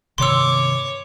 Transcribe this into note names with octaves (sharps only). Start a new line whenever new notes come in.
G2 C3 D#3 C#5 C6 D6 E6